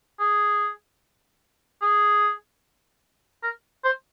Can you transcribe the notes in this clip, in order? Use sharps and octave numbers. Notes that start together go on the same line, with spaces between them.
G#4
G#4
A#4
C5